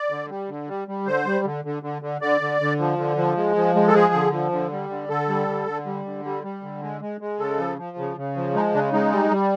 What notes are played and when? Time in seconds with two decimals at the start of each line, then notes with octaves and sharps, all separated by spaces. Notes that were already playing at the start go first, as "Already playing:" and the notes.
Already playing: D5
0.10 D3
0.30 G3
0.49 D3
0.68 G3
0.88 G3
1.06 D3 C5
1.26 G3
1.45 D3
1.65 D3
1.83 D3
2.02 D3
2.21 D3 D5
2.41 D3
2.61 D3
2.79 F3
2.98 D3
3.17 F3
3.37 G#3
3.56 F3
3.75 G#3
3.88 A4
3.94 F3 G#4
4.14 D3
4.32 F3
4.52 D3
4.72 G3
4.90 D3
5.09 D3 A4
5.29 G3
5.48 D3
5.67 D3
5.86 G3
6.05 D3
6.25 G3
6.44 G3
6.63 D3
6.82 G#3
7.01 G#3
7.21 G#3
7.39 C#3 A4
7.58 F3
7.78 F3
7.98 C#3
8.17 C#3
8.36 F3
8.54 G#3 D#4
8.74 C#3 D4
8.93 G#3 D#4
9.12 G3
9.31 G3